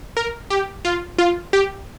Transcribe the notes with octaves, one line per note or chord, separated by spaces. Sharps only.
A#4
G4
F4
F4
G4